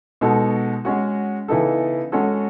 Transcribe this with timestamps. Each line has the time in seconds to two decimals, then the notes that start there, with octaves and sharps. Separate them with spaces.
0.21 B2 G#3 D#4 F#4 A4
0.85 G#3 C#4 F#4
1.48 C#3 E3 B3 D#4 A4
2.12 G#3 C#4 F#4 A4